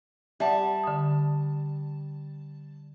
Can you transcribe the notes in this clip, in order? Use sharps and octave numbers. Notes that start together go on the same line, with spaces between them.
G3 E5 F#5 A5
D3 D#6